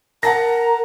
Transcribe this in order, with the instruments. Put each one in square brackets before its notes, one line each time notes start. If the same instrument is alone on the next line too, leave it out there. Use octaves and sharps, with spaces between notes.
[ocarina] A#4 [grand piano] F#5 A5 A#6 [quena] A#5